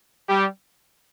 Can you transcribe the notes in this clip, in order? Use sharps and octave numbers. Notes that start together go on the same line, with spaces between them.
G3 G4